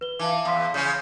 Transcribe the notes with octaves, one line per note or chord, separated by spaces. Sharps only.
B4 G7
E3 F5 A5 D6
E2 F5 C6 B6
C#3 C#4 G6